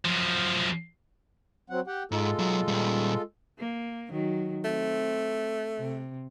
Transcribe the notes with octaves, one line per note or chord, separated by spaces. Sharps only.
F#2 F3
F#3 C4 F#5
G4 F#5 G5
G#2 G#3 F4 A4
B1 F#3
A#2 G3
A#3
D#3 F#3
A3 C4
C3